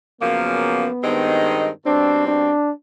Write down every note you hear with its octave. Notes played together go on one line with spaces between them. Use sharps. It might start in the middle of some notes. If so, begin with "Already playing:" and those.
F#2 C#3 F3 A#3 B3
G2 D#3 G#3 C4 D#4
B2 G3 C4 D4
D4